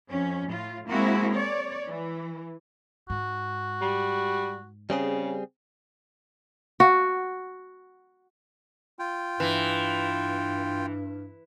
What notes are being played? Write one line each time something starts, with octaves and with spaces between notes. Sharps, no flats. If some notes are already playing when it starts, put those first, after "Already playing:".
F2 C#4
A2 F4
G#3 A#3 C4 E4 F#4
C#5 D5
E3
G#2 F#4
G3
C#3 G3 C4 G#4
F#4
F4 G5
G2 E3